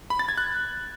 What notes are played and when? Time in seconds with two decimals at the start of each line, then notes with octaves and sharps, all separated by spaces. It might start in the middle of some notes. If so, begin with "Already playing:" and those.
0.10 B5
0.19 A6
0.28 G#6
0.38 F#6